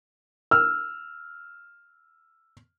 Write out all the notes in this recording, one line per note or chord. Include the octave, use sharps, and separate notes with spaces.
E6 F6